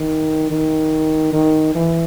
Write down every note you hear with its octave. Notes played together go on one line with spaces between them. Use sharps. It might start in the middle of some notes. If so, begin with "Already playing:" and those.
Already playing: D#3
D#3
D#3
E3